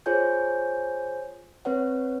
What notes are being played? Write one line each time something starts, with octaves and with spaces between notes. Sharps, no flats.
F4 G#4 C5 C#5 G#5 G6
C4 B4 C#5 F#5